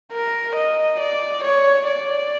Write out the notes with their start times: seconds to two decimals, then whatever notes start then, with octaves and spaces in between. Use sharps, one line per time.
0.12 A#4
0.56 D#5
1.00 D5
1.44 C#5
1.87 D5